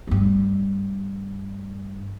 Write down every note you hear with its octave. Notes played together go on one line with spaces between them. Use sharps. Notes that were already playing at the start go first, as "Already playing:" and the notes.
G2 A3